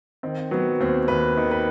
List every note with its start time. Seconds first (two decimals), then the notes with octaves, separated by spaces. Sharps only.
0.23 D#3 C4
0.51 F#3 B3
0.80 D#2 C4
1.08 D#2 B4
1.37 D#3
1.51 B4